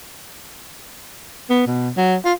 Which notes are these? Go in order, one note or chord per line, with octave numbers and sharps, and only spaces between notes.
B3
B2
F#3
F4